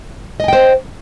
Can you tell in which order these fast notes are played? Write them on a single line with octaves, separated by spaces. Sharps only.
D#5 G#5 G5 C5